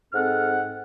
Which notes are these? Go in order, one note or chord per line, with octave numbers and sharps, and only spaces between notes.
G#2 C4 A4 F#5 F6